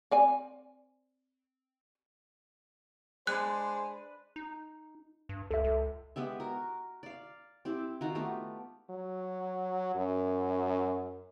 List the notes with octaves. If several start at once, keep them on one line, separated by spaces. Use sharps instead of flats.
C4 D5 G#5
G#3 D4 B4 C5 F#6
D#4
G2
C#2 A4 E5
C#2
G#3 B3 G4 E5
F#4 A#4
D5 F5
C4 E4 G4
D#3 F4 F#4 A#5
A3 B3 G4
F#3
F#2